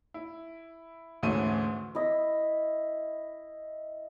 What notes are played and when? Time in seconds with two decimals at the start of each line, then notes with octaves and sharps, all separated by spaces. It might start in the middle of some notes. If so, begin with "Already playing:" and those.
0.14 E4
1.23 D2 G#2 E3 A3 C#4 D#7
1.95 E4 D#5